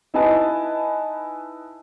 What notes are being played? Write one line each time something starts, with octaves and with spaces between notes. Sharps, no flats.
D#4 E4 B4 D#5 G#5 A5